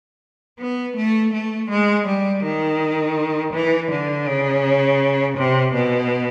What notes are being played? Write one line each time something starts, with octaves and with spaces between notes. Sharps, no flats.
B3
A3
A3
G#3
G3
D#3
E3
D3
C#3
C3
B2